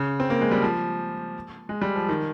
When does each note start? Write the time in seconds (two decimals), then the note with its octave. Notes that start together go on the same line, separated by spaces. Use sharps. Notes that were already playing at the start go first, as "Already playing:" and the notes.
Already playing: C#3
0.20 C4
0.30 A#3
0.41 G#3
0.52 G3
0.62 F3
1.69 G#3
1.82 G3
1.96 F3
2.09 D#3